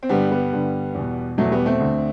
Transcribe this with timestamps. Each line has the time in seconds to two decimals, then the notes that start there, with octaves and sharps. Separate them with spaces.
0.03 C4
0.09 G2 D3 G3 B3
0.31 G3 B3
0.52 G2 D3
0.94 E2 B2
1.38 E2 B2 F#3 A3
1.52 G3 B3
1.66 A3 C4
1.80 D2 D3